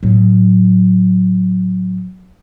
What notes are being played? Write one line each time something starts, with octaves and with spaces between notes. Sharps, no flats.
A2 F#3